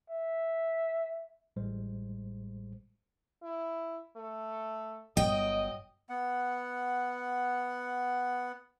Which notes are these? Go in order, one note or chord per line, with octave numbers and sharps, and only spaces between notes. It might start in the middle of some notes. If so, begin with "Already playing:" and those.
E5
A1 A2 G3 G#3 C5
E4
A3
G1 F#3 D#5 G5
B3 F#5